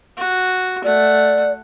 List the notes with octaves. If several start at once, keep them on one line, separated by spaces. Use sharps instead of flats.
F#4
A3 D5 F#5